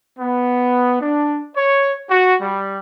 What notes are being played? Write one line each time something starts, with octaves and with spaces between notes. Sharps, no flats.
B3
D4
C#5
F#4
G3